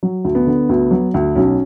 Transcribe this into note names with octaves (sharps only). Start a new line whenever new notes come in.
F#3
D2
B3
D3
D2
F#3
D2
B1 C#4